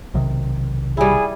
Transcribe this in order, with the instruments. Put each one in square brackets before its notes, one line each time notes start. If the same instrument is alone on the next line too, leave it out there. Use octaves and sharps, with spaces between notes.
[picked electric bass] B1 C3 D#3
[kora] G3 E4 [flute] G#4